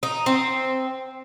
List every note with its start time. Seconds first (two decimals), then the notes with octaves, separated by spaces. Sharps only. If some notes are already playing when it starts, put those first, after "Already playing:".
0.03 D#4
0.26 C4